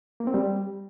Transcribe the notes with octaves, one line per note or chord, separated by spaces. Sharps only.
A#3
C4
G3